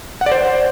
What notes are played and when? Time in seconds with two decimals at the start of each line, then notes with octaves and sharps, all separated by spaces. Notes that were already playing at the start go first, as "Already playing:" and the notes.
0.21 F#5
0.26 D5
0.32 C5